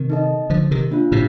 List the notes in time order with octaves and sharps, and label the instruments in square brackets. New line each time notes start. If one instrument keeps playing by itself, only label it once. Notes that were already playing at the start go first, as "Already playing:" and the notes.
Already playing: [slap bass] C3 D#3
[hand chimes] D#4 A4 D#5
[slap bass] D3 F3
C3 D#3
[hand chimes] A#3 D4 F4
[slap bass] A2 C3